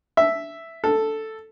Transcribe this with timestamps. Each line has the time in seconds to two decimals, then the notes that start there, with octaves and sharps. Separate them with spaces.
0.17 E5
0.84 A4